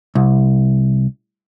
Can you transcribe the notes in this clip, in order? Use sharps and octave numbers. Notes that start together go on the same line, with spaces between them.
C2